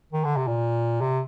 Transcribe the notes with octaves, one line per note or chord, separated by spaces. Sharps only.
D#3
D3
C3
A#2
C3